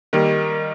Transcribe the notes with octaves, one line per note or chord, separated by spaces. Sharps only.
D#3 G3 A#3